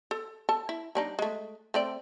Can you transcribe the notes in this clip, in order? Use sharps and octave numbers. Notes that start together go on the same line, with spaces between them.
A4
A4 A5
E4
G3 D4 D#4
G#3 A3
A3 C4 D5